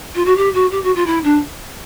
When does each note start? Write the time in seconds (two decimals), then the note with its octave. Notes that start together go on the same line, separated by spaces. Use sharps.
0.15 F4
0.25 F#4
0.36 G4
0.54 F#4
0.71 G4
0.83 F#4
0.95 F4
1.06 E4
1.24 D4